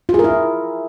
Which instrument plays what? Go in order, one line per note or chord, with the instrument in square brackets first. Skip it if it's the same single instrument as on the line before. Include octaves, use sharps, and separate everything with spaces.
[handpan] F4
G#4
A#4
E4